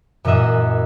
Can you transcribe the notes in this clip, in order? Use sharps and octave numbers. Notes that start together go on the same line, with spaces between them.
F#2 A#2 E3 D#5 E5 F#5